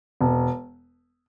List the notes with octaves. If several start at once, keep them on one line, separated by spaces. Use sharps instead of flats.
E1